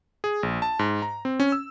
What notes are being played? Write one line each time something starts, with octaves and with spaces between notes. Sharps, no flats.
G#4
A#1
A5
G#2
A#5
C4
C#4
E6